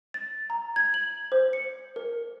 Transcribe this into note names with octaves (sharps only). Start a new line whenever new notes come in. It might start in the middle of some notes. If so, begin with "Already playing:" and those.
A6
A#5
G#6
F#7
C5
C#7
A#4